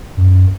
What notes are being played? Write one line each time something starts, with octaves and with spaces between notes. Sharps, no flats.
F#2